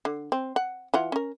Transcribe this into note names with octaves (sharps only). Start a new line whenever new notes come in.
D3
C4
F#5
E3 F4 F#5
C#4 A#4